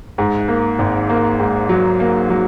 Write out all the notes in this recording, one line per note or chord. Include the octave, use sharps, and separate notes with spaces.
G#2
A#3
G#1
A#3
G#2
F#3
A#3
F#3